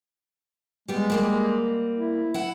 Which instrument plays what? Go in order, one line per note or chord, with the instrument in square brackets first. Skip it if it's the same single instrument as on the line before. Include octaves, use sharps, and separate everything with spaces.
[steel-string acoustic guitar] G3 B3 [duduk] G#3
[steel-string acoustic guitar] G3 A#3 C4
[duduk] E4
[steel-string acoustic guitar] E4 F#5